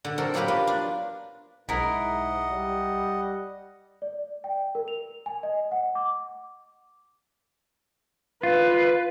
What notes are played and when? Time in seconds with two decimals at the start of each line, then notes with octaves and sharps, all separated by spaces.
0.05 D3
0.18 C4 F#4 A4 A#4
0.34 F#3 A#3 B3 G4 A#4 B4
0.48 D4 F4 B4
0.67 D4
1.69 B1 G#2 E4 A#4 D#5 F#5
2.50 G3
4.02 D5
4.44 G5
4.75 A#4
4.88 F7
5.26 G#5
5.43 D#5
5.71 F#5
5.95 D6
8.43 F4 B4